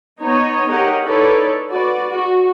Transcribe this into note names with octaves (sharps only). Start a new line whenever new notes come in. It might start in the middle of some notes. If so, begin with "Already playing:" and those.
B3 D#4 C#5 D#5
D#4 G4 A#4 C#5 D#5 F#5
D#4 E4 A4 B4 C#5 D5
F#4 B4 D5
F#4